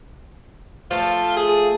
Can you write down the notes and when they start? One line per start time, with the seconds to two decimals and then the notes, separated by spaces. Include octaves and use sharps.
0.91 F3 A3 F4 A5
1.37 G#4